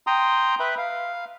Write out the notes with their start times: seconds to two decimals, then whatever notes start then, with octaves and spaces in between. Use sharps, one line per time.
0.07 G5 A#5 C6 D#6
0.60 B4 E5 B5
0.78 F5